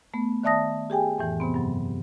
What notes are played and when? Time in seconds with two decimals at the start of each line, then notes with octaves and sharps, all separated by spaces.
0.14 A3 B3
0.44 D#3 D5 E5 A5 D#6 A#6
0.90 G4 G#4 G5 G#5
1.18 F2 A2 E3
1.40 C3 B3 C4
1.54 G2 F#3